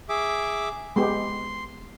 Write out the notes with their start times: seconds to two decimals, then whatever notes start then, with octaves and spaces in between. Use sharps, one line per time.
0.09 G#4 E5 D6
0.96 G#3 B3 G4 C6